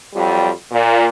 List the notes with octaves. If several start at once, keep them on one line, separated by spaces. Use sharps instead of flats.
F2 F#3 G3
A#2